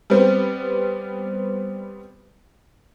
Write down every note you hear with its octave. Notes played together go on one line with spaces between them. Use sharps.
G3 B3 C4